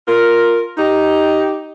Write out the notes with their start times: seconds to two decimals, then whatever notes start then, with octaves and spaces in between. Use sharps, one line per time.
0.07 F4 A#4
0.77 D#4 G4